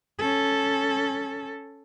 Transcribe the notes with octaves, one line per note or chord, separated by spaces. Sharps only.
C#4 A4